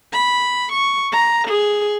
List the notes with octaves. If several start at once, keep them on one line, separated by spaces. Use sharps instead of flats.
B5
C#6
A#5
G#4